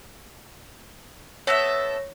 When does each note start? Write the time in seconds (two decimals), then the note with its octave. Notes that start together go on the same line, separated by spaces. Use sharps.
1.47 B3 A4 C#5 E5 A#6